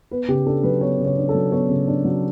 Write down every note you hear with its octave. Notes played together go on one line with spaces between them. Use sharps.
B3 B4
C#3 G4
D4 A4
F#3 B4
B3 C#5
C#3
C#5
D4
A4
F#3
B3 C#5
C#3
D4
F#3